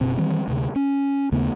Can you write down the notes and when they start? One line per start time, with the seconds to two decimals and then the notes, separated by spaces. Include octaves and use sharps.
0.01 F#1 B2 C4
0.17 D#3 E3 G3 C4
0.48 D2 C3
0.76 C#4
1.32 D#2 C#3 A3 B3